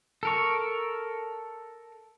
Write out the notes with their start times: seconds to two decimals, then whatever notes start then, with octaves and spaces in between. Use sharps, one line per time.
0.23 A4 A#4 C#6